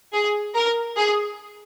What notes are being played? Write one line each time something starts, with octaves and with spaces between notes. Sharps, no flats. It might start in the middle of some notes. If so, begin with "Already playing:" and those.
G#4
A#4
G#4